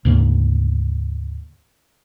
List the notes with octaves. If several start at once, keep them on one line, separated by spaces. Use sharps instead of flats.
D2 G#2 C#3 A#3